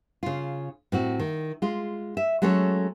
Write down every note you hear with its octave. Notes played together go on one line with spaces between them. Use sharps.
C#3 F4
A2 C4 F#4
D#3
G#3 F4
E5
F#3 G#3 A3 C#4 A4 C#5